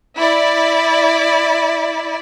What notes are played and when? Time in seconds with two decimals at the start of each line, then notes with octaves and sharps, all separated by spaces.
0.17 E4 D5